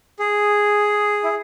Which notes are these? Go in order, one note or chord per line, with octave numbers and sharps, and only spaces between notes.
G#4
E4